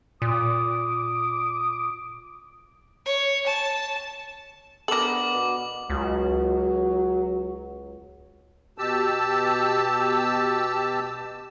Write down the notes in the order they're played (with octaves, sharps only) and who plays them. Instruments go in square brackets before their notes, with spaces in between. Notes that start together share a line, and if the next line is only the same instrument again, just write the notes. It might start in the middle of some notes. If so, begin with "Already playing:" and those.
[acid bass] A#2 [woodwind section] D6 D#6
[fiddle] C#5
A5
[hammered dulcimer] B3 D4 [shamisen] A4 A#4 [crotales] D6 F#7
[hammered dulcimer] B2
[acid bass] C#2 [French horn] F#3
[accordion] B2 G4 A5 E6